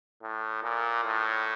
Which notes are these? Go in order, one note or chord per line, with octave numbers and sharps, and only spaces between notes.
A2
A#2
A2